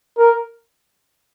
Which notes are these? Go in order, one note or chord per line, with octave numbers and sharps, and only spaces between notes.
A#4